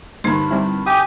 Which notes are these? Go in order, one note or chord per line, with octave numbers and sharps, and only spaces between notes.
G2 D3 D#4 A#4 B5 C6
G3 C4 E4
G4 G#5 D#6